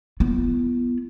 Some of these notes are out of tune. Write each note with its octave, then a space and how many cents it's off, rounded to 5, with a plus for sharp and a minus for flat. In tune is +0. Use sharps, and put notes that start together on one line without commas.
B3 -10 F4 -45